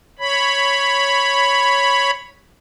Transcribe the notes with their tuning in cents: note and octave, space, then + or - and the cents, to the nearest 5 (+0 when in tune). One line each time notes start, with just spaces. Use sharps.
C#5 +0 B5 +0